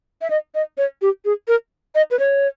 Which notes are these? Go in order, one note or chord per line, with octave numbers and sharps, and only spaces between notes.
E5
D#5
D#5
C#5
G4
G#4
A#4
D#5
B4
C#5